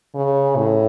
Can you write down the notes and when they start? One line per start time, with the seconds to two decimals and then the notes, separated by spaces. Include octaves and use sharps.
0.15 C#3
0.57 A2